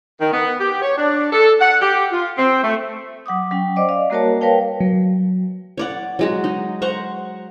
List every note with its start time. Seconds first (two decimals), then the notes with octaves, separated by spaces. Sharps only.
0.20 D#3
0.32 B3
0.59 G4
0.81 C#5
0.97 D4
1.32 A4
1.60 F#5
1.80 G4
2.10 F4
2.37 C4
2.62 A3
3.26 F#3 F#5 D6 D#6
3.51 F#3 C#4 G5
3.76 C5 D5 D#5 D6
3.89 D5 D#5 F5
4.10 G3 A#3 F#4 A#4 C#5 A5
4.41 A#4 B4 C#5 F5 G5 A5
4.80 F#3
5.77 C#5 D5 F#5
6.19 F#3 G#3 F#4
6.44 D#4
6.82 C5 F#5 A#5 C#6